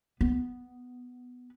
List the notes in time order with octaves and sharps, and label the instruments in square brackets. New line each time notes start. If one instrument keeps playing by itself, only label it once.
[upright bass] B3